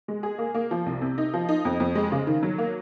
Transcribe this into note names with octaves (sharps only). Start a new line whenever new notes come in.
G#3
G#4
A#3
A#3
F3
C2
C3
D#4
F3
D#4
F2
F2
G#3
C#3
D#3
F#3
A#3